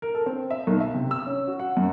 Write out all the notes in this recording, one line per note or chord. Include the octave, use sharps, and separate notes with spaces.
A#4
A4
C4
E5
B1
E5
C3
E6
C#4
F#4
F#5
F#2